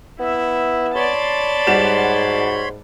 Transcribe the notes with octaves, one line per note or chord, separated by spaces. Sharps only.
B3 E4 E5
C#5 D5 A5 B5 C6
G#2 G3 F#4 E7